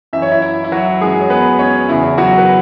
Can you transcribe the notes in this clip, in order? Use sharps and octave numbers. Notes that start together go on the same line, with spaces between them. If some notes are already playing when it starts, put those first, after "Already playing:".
F#2 E3 E5
C#5
E4 E5
E4
E4
F#3 F#4
F#2 E3 G#3 G#4
C#5
B3 B4
C#4 C#5
E2 C#3 E3 E4
F#3 F#4
B4